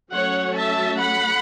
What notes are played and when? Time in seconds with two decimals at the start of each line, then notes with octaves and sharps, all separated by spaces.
0.12 F#3 A3 C#4 C#5 F#5
0.57 E5 A5
1.00 F#5 B5